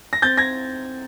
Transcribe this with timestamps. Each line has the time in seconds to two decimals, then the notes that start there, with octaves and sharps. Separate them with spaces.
0.13 A#6
0.22 C4 G6 A6
0.38 G#6 A#6